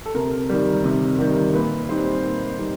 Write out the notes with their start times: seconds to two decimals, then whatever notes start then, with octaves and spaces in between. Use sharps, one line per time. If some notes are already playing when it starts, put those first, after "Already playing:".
0.06 A4
0.15 C3 A#4
0.49 D#3 G3
0.84 C3
1.19 D#3 G3
1.54 A#2 B4
1.89 G3 C4 D#4 C5
2.24 A#2
2.59 G3 C4 D#4